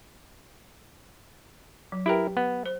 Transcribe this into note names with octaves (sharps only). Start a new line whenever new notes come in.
F#3
E4 G4 A#4 B4 G5
B3
C5